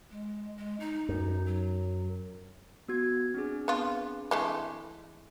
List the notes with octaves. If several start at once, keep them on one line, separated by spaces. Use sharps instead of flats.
G#3
G#3
D#4
F#2
F#3
B3 F#4 G#6
C4 D4 G#4
B3 F4
E3 G#3 A3